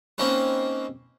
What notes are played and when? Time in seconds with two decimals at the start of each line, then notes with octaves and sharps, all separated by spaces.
0.18 A#3 C4 C#4 D#4 B4